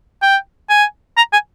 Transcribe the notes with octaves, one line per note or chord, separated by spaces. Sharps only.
G5
G#5
A#5
G#5